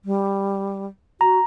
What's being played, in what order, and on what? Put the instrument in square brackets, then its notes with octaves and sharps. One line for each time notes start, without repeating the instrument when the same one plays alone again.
[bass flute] G3
[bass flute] F#4 [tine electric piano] A#5